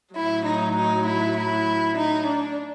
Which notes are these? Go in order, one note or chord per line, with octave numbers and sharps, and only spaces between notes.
A2 F#3 E4
D#4
D#4
E4
E4
D#4
D4